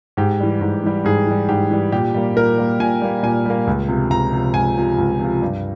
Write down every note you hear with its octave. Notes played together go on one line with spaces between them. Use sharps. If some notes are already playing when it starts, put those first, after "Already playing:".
G#2 G4
E3 G3
G#2
E3 G3
G#2 G#4
E3 G3
G#2 G4
E3 G3
A#2 G4
G3 A#3
A#2 A#4
G3 A#3
A#2 G#5
G3 A#3
A#2 G#5
G3 A#3
C#2
C3 F3
C#2 A#5
C3 F3
C#2 G#5
C3 F3
C#2
C3 F3
G2